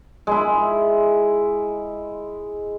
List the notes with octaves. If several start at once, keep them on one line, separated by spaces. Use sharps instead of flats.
G#3 E4